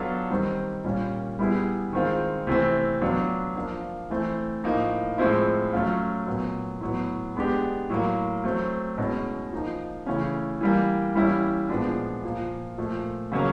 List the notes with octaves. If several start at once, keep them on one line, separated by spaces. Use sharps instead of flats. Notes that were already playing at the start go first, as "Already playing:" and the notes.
Already playing: F#3 B3 D4 F4 A4
D#3 G3 C4
A#2 G3 A#3 C#4
G3 B3 E4 G#4
D#3 G#3 C4 F4
C3 E3 A3 C4
F#3 B3 D4 F4
F3 A#3 D4 F4
E3 A3 C4
A2 F3 A#3 D#4
A2 F3 G#3 C4 E4
F#3 A3 C#4 F4
A#2 F#3 B3
A2 F#3 B3
G#3 B3 D4 G4
A2 F#3 A#3
F#3 A3 C4
B2 G#3 C#4 E4
F3 A#3 D#4
C#3 E3 A3 C#4
E3 G3 A#3
E3 G3 A#3 C#4 E4
A#2 F3 G#3 B3 D4
A#2 F3 A#3
A#2 F3 A3
C#3 F#3 A#3 C#4